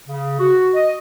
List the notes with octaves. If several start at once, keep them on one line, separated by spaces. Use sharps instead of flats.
C#3
F#4
D#5